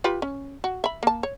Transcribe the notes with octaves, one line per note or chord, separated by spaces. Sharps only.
F4 G4 B4
C#4
F#4
E5 B5
A#3 A5
C#5